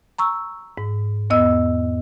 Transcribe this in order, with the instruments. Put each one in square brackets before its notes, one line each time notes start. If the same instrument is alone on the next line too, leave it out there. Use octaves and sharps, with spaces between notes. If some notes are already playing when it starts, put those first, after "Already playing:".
[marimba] A#5 C#6 E6
G#2
E2 B3 D#5 E6